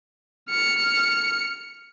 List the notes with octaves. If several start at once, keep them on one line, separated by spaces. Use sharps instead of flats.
F6 C#7